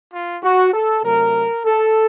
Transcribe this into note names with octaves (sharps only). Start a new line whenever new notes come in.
F4
F#4
A4
C3 F#3 A3 A#4
A4